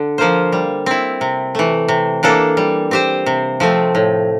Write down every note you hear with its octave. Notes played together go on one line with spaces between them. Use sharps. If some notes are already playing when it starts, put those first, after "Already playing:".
Already playing: D3
F3 A#3 F4 C5
G3
C4 E4
C3
E3 A3
C3
E3 A#3 D4 A4
G3
C4 G4 C5
C3
F3 A3 C4
A2